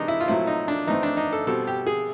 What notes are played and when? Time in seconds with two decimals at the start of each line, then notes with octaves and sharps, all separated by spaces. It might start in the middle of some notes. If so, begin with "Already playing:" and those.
Already playing: C3 E3 G#3 D4 D#4
0.08 E4
0.20 F4
0.27 A#2 F#3 A3 C4 E4
0.47 D#4
0.68 D4
0.87 E3 A3 C4 D#4
1.03 D4
1.17 D#4
1.33 A4
1.47 B2 G3 C4 A4
1.67 G4
1.86 G#4